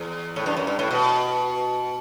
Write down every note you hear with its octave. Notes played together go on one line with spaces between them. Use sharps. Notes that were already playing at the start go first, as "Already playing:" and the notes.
Already playing: E2
A2
G2
F#2
G2
A2
B2